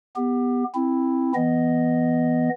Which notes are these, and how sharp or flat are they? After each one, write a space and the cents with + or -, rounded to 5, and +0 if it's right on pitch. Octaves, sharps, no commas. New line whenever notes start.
B3 +0 G4 +25
C4 +10 E4 +0
E3 +0 B3 +0 D#5 +0